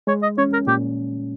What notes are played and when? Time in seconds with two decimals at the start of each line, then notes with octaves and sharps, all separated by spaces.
0.07 G#3 C#5
0.23 D#5
0.38 C#4 C#5
0.53 A#4
0.67 A#2 G4